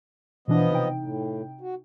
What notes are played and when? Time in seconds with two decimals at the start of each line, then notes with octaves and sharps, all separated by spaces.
0.48 B2 E3 F3 B3 D4 D#5
0.71 C3 D#4 G5
0.99 A2
1.61 F#4